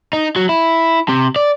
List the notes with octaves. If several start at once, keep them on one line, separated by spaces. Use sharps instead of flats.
D#4
F#3
E4
C3
D5